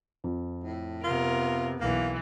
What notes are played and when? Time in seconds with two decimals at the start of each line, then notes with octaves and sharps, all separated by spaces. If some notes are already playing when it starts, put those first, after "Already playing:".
0.24 F2
0.64 A2
1.03 C3 B3 F4 A#4
1.80 B1 E3 A#3